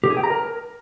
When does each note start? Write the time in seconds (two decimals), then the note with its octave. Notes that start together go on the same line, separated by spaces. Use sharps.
0.04 G4
0.10 G#4
0.17 G5
0.23 A#5
0.30 A#4